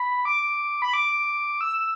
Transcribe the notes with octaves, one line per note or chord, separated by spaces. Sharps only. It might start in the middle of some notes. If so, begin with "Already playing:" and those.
Already playing: B5
D6
B5
D6
E6